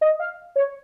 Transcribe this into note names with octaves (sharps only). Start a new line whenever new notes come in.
D#5
F5
C#5